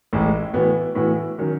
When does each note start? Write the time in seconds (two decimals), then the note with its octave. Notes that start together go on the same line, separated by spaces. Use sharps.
0.13 A1 A2 G#3
0.54 A2 E3 B3 F#4
0.95 A2 E3 B3 F#4
1.39 D#3 F#3 C#4